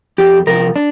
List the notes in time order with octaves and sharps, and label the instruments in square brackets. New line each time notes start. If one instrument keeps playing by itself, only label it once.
[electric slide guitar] F2 G4
C3 F3 A#4
D4